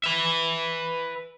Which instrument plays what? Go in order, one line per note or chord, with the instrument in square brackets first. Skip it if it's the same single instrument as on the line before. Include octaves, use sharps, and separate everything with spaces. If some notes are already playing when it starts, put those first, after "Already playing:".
[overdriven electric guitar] B4 E5